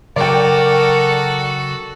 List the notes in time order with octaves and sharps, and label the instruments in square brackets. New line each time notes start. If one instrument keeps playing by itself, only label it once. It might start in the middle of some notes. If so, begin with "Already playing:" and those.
[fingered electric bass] C#3 F#3 [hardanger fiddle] F#4 A4 [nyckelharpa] A#4 [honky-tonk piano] D5 G5